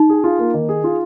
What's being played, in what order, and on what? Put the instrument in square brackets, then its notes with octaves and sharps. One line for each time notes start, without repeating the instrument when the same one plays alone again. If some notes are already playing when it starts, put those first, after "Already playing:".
Already playing: [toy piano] D#4
[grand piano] G#4
F4
A#3
D#3
G#4
F4